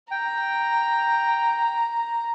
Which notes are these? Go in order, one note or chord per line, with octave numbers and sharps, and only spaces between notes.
G5 A#5